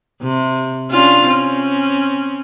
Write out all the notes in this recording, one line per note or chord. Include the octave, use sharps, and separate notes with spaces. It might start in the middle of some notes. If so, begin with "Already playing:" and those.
C3
C#4 D4 F4
C4 C#4